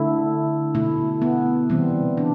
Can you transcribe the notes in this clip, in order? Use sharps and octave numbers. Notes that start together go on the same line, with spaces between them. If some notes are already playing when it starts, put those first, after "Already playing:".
Already playing: D3 A3 E4
B2 A3 E4
B3
C3 E3 G3 C4
D4